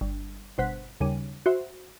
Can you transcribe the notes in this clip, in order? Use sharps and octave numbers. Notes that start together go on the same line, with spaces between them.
G1
G1 B2 C5 F#5 F#6 B6
D#2 C#3 G3 D#7
F#4 C5 E5